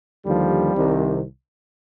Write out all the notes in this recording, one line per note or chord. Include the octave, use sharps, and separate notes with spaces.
D#2 D3 F3 G3
C2 C3 D#3